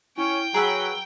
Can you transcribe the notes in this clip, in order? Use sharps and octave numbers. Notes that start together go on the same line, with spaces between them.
C#4 E4 G5
F#3 G#4 B4 A#5 B5 E6